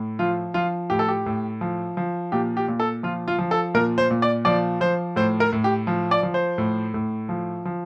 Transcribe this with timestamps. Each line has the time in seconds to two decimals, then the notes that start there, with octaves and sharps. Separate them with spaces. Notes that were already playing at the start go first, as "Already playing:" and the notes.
Already playing: A2
0.19 F3 F4
0.54 F3 F4
0.90 A2 G4
0.99 A4
1.08 G4
1.26 A2
1.61 F3
1.97 F3
2.32 A#2 G4
2.57 G4
2.68 A#2
2.80 A4
3.03 F3 F4
3.28 F4
3.39 F3
3.51 A4
3.74 A#2 A#4
3.98 C5
4.10 A#2
4.22 D5
4.45 F3 D5
4.81 F3 C5
5.16 A2 C5
5.40 A#4
5.52 A2
5.64 G4
5.87 F3
6.11 D5
6.23 F3
6.34 C5
6.58 A2
6.94 A2
7.29 F3
7.65 F3